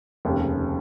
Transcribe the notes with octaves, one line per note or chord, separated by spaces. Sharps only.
F1 D#2 C#3